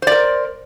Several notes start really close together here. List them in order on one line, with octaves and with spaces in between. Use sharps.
C5 D5 A#4